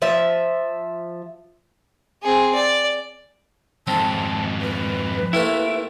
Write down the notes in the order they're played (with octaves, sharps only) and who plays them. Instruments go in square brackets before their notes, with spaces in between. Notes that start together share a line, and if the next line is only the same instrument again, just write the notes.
[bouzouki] F3 E5
[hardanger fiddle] C4 G#4
D5
[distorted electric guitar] F2 G#2 [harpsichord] C4 [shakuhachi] A5
[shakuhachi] B4
[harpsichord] C3 A3 A#3 [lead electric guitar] E4